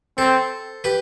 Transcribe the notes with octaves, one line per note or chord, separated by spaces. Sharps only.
C4 A4 C5
G4 B4